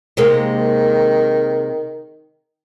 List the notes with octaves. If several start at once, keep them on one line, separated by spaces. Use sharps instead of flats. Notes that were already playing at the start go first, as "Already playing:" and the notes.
C3 D#3 G#3 A#3